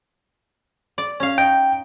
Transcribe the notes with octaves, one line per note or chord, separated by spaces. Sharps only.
D5
C#4 F5
D#4 G5